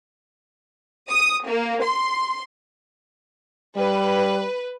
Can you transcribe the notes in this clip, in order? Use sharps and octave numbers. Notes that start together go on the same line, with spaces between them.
D#6
A#3
C6
G3 B4